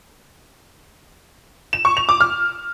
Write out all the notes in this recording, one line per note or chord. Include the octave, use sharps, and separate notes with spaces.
E7
C#6
F7
D6
F6